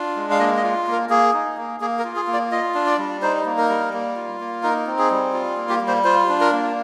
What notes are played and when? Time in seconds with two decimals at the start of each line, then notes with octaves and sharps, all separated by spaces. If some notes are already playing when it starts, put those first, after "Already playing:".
Already playing: D4 F4
0.16 G#3
0.31 F5
0.39 A#3 D#5
0.57 D#5
0.63 F4
0.87 A#3
0.92 A#4
1.10 A#3 G#4
1.33 D#4
1.57 A#3
1.80 A#3 G#4
1.99 A#4
2.04 F4
2.16 G#4
2.27 A#3
2.33 D5
2.51 F4 D#5
2.74 D4
2.86 D5
2.98 G3
3.22 D#4 C5
3.46 A#3
3.58 A#4
3.69 G3
3.93 A#3
4.16 F4
4.40 A#3
4.63 D#4 A#4
4.87 C4
4.98 G#4
5.10 G3
5.33 F4
5.57 A#3
5.69 G4
5.81 G3
5.88 C5
6.04 F4 C5
6.29 D4
6.40 A#4
6.52 A#3